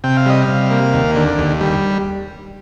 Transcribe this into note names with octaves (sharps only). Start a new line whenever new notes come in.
C3 G5
F5
G3 D#5
F5
C3
A#3
D#2
D3
D#2
G3